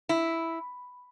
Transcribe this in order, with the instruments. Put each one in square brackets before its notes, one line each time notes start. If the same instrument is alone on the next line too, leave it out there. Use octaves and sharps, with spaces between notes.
[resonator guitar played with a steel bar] E4